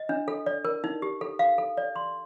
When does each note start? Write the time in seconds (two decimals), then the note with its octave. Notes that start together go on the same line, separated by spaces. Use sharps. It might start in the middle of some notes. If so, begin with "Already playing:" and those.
Already playing: D#5
0.09 D4
0.28 A4
0.46 D5
0.65 A#4
0.84 D#4
1.02 G4
1.21 A4
1.39 F5
1.58 A4
1.77 D5
1.96 C6